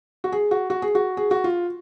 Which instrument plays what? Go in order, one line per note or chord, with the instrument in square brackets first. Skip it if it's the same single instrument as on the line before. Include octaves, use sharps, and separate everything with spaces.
[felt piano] F#4
G#4
F#4
F#4
G#4
F#4
G#4
F#4
F4